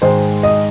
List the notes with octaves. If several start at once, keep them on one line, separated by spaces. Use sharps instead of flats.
G#2 D#3 G#3 C5
D#5